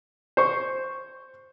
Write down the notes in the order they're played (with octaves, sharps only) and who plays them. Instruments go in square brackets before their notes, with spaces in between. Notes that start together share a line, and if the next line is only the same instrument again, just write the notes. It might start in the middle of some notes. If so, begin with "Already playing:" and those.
[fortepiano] C5 C#6